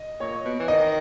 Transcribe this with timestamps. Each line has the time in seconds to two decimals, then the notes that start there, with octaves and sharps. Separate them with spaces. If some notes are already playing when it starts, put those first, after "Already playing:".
Already playing: D#5
0.20 A#2 C#5
0.44 B2
0.59 E3
0.68 D#3 D#5